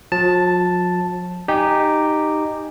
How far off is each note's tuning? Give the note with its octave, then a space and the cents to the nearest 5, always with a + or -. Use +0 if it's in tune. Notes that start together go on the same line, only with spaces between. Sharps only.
F3 +45 A5 +0
D#4 -10 G4 +0 G#5 +0